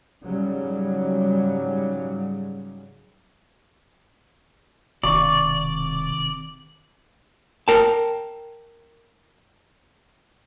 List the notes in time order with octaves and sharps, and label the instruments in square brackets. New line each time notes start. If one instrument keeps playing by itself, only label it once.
[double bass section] G#2 C#3 F#3 G3
[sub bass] E1 [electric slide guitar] C3 D#3 F5 [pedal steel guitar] D5 [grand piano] C#6
[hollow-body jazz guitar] A#4 G5 A5